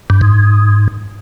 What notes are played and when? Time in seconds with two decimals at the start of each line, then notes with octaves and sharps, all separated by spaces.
0.10 G2
0.21 G#2